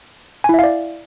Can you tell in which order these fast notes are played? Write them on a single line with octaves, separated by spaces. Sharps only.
G#5 E4 E5 F5 D5